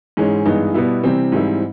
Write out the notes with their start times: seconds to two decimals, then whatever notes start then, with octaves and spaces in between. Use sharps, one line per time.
0.17 G#2 E3 G#3 C#4
0.46 G2 E3 G#3 B3 D#4
0.74 B2 G3 B3 E4
1.03 C3 E3 G3 C4
1.32 G#2 E3 G3 C4 E4